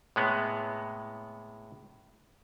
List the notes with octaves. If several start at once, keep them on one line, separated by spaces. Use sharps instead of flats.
A2 C3 G#3 B3